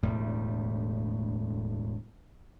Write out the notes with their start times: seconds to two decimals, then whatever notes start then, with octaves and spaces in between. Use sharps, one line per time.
0.03 E1 D2 A2 G3